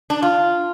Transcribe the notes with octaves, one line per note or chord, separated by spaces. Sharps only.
D4
F4